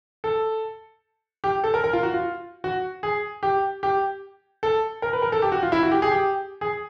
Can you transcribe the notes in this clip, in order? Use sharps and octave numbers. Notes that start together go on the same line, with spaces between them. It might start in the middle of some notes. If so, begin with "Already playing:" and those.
A4
G4
A4
A#4
A#4
F4
F#4
F4
F#4
G#4
G4
G4
A4
A#4
B4
A#4
A4
G4
F#4
F4
E4
F#4
G4
G#4
G4
G#4